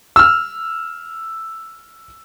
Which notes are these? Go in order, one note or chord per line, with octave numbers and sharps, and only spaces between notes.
E6 F6